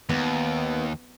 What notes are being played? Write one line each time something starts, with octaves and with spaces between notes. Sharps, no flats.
D#2 B3